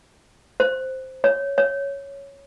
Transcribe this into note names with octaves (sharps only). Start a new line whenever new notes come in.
C5
C#5
C#5